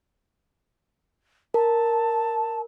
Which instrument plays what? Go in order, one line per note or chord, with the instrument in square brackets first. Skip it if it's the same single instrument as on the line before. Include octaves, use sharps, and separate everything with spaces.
[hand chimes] A#4 [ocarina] A5